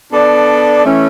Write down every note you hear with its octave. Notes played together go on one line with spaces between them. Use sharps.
B3 D4 A4 D5
E3 A3 C#4